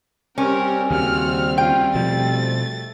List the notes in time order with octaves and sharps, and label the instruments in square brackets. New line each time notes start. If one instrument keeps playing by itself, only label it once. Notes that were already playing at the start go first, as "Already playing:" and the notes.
[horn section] G3 C4 [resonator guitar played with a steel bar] C#4 [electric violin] G4 A#4
[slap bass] D#2 C#3 [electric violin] F#4 F6
[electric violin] C#4 F4 [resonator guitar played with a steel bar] G5
[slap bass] B2 F3 [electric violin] A3 A6